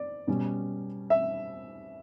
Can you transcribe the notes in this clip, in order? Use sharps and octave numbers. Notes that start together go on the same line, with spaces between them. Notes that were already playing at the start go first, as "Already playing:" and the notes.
Already playing: D5
B2 G3 C#4
E5